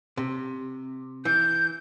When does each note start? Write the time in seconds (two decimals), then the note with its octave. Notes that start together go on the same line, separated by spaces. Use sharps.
0.17 C3
1.25 E3 G6